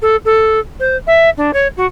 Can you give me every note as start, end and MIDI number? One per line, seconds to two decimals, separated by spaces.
0.02 0.16 69
0.25 0.59 69
0.80 0.96 72
1.07 1.30 76
1.37 1.51 62
1.53 1.67 73
1.77 1.86 66